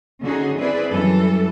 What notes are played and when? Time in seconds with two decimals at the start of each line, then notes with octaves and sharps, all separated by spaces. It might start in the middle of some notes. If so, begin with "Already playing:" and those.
0.24 D3 C#4 D#4 F#4 G#4
0.60 C4 E4 G#4 B4 D5
0.92 F#2 E3 G3 A4